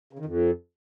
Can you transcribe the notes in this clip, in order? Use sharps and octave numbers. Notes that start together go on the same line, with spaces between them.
C#3
D#3
F2